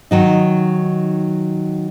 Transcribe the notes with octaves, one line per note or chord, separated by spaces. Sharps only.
D#3 F#3 D#4